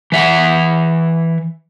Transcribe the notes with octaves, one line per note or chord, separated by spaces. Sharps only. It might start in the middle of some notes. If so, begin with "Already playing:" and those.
E3 E5 F#5